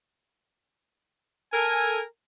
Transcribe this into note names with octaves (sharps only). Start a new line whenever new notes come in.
A4 A#4 G#5